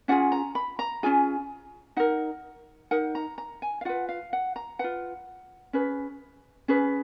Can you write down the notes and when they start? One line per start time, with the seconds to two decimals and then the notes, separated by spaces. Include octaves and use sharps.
0.08 C#4 F4 G#4 F#5
0.32 A#5
0.55 B5
0.79 A#5
1.03 C#4 F4 G#4 G#5
1.97 D#4 A#4 F#5
2.91 D#4 A#4 F#5
3.15 A#5
3.38 A#5
3.62 G#5
3.81 F5
3.85 F4 B4 F#5
4.09 F5
4.33 F#5
4.56 A#5
4.79 F4 B4 F#5
5.73 C#4 G#4 B4
6.68 C#4 G#4 B4